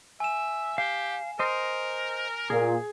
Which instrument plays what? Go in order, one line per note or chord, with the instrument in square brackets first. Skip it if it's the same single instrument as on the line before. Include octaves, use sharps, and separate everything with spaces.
[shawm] E5 [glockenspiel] G#5 E7
[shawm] G4 [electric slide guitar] F5
[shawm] A#4 [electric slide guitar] C5 D#5
[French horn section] A#2 [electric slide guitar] G#4